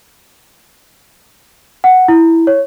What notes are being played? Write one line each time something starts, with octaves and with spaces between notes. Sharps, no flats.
F#5
E4
C#5